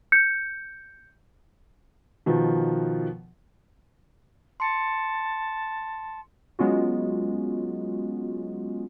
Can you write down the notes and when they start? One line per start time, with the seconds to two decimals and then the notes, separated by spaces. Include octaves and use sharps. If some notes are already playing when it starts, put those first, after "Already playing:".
0.12 G6 C#7
2.26 B2 D#3 F3
4.60 A5 C6 C#7
6.59 F#3 G#3 B3 C#4 F4 F#4